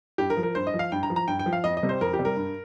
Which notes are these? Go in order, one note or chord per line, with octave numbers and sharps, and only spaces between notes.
G2 G4
A#4
F3
A#4
G2 C5
D#5
F3
F5
G2 G5
A#5
F3
A#5
G2 G5
G5
F3
F5
F2 D#5
D#5
C3 G3
C5
F2 A#4
G4
C3 G3
A#4
G2